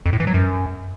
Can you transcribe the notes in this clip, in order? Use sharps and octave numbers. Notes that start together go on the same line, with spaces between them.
F2
A2
E3
F#3
F#2